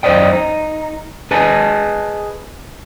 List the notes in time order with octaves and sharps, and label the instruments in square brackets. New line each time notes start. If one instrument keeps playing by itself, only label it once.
[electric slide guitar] F#2 C5 D5 D#5 G5
D#4
G#4 B4 D#5 G#5 A5